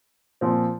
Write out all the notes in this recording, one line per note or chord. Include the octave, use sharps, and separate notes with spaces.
A#2 F3 C4